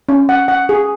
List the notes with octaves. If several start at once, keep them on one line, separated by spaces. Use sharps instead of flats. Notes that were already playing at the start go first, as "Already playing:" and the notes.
C#4
F#5
F#5
G#4